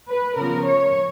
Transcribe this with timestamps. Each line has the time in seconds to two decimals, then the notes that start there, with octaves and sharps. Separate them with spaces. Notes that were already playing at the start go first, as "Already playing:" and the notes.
0.09 B4
0.36 C#3 F3 B3 A#4
0.65 C#5